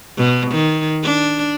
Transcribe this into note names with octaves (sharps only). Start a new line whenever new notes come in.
B2
D#3
D4